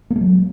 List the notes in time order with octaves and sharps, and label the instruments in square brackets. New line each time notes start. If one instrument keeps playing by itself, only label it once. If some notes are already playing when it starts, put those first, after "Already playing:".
[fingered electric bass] A#3
A3
F#3